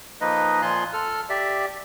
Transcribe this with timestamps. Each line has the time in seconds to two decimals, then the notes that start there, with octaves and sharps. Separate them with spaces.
0.21 F3 A#3 D#4 B4 D#5
0.62 A#2 F3 F4 G#5 C6 F#6
0.93 A4 F6
1.30 G4 D5 E5